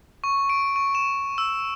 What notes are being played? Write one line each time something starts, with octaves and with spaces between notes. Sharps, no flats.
C#6
D7
C#6
E7
E6